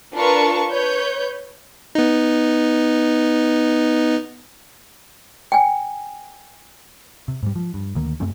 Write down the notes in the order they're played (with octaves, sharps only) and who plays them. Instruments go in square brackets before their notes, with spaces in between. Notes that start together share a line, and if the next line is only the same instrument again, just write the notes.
[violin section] D4 F4 A#4 B4 A5 C#6
B4 C#5 G6
[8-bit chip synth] B3 D#4
[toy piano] G5 G#5
[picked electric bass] C3
G#2 G3
F3
G2
D2 D#3 A#3
F#2 A3 C4 C#4